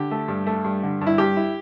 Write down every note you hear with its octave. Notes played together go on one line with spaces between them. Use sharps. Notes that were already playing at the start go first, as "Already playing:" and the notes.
Already playing: D3 G4
A3
G2
A3
G2
D3
G2
E4
G2 G4
E4